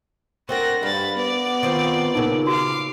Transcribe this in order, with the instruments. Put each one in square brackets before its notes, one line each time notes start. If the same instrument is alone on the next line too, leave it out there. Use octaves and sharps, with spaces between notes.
[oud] C4 D4 A#4 [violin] F#4 A#6
[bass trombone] G2 [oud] F5 [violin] B5 A6
[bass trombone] B3 [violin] D5
[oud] D#3 C4 F4
[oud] A#2 C#3 [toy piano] D#4 A#4
[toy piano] F#4 [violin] F5 D6